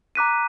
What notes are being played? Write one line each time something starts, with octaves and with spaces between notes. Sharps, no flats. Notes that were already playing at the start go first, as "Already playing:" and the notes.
A#5 D6 F#6 B6 D#7